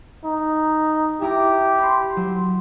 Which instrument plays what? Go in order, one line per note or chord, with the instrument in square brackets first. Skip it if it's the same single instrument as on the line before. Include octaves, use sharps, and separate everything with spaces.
[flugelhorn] D#4
[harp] E4 A#5 D6 [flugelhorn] G4
[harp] B5 C6
F#3